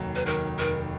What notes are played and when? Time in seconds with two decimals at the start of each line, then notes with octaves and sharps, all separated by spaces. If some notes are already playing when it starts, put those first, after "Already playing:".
Already playing: F1 D#2 F#3
0.15 B4
0.26 D#3 A#4
0.58 F1 A#4